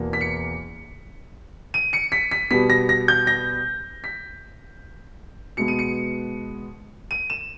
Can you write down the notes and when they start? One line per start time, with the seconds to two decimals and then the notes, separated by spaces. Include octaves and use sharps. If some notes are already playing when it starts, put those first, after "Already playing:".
Already playing: E2 B2 A#3
0.13 B6
0.21 C#7
1.74 D#7
1.93 C#7
2.12 B6
2.31 B6
2.51 B2 G3 B3 B6
2.70 A#6
2.89 A#6
3.08 G6
3.27 A#6
4.04 B6
5.57 B2 G#3 B3 C#7
5.68 D#7
5.79 C#7
7.11 D#7
7.30 E7